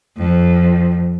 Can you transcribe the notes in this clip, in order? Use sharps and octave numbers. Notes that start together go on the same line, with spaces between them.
F2